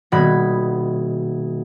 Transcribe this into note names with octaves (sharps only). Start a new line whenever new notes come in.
D#1 B2 B5 G#6